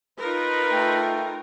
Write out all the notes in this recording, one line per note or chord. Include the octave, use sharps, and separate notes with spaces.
D#4 F4 A#4 B4
A3 G5